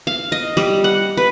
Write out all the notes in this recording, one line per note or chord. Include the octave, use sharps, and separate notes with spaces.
F5
D#5
G3
F#5
B4